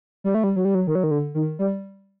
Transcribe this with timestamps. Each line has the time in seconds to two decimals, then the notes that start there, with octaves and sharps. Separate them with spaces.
0.24 G3
0.35 A3
0.44 G3
0.56 F#3
0.65 G3
0.75 F#3
0.87 D#3
0.95 F#3
1.04 D#3
1.11 D3
1.35 D#3
1.59 G3